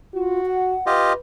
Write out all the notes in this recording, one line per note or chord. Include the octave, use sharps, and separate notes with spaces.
F4 F#4
F#5
F4 G4 B4 D#5